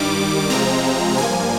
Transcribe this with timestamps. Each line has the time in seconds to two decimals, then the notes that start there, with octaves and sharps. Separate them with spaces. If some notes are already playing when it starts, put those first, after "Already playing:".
Already playing: G2 D#3 G3 D6
0.50 C3 F3 G#3 C4 A#5
1.18 G2 F3 A#3 G#5